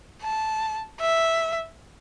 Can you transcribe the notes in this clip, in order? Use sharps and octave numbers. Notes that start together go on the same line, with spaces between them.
A5
E5